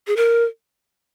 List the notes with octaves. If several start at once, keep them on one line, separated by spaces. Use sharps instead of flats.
G#4
A#4